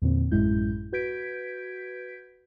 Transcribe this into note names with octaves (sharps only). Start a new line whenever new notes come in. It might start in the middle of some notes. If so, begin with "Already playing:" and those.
E2 A#2 D3 C4
A1 F#2 A2 G#3 E4 G6
F#4 B4 G6 G#6 B6 D7